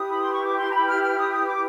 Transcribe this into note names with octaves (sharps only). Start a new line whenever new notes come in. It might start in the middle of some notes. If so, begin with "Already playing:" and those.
Already playing: E4 G4 B4 D#6
B5
C6
C#6
D6
C6
A#5
B5
F6
F6
D#6
D#6
D6